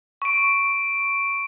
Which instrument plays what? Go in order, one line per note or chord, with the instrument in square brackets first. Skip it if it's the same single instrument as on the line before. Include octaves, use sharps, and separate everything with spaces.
[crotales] C#6 D7